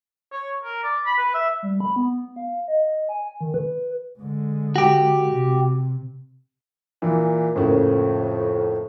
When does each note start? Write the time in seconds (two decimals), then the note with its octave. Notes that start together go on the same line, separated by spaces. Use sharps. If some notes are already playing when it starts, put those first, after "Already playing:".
0.32 C#5
0.64 A#4
0.83 D5
1.06 B5
1.17 B4
1.34 E5
1.63 G3
1.80 B5
1.96 B3
2.36 F5
2.68 D#5
3.09 G#5
3.41 D#3
3.54 B4
4.19 D3 G#3
4.76 F#4 G4
5.30 C3
7.02 A#2 E3
7.56 F2 A2 C#3 A#3